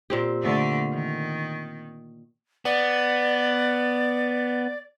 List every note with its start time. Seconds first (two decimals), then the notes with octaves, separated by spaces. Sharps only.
0.10 A#2 C4 G4
0.42 D3 A3
0.92 D#3
2.65 B3 D5